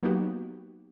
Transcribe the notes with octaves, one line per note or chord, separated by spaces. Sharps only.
F#3 A#3 B3 D#4 F#4 G4